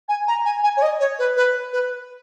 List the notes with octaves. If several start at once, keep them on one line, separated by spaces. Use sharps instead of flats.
G#5
A#5
G#5
G#5
C#5
D#5
C#5
B4
B4
B4